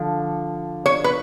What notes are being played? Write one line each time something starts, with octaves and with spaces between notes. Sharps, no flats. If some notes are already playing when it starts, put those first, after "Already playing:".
Already playing: D3 F3
C#5
B4